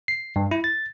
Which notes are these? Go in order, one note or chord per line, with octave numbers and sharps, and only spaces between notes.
C7
G2
E4
A6